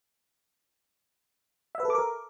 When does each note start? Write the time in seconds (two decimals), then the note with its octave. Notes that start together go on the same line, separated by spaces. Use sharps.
1.75 E5
1.80 B4
1.85 A4
1.90 D6
1.95 A#4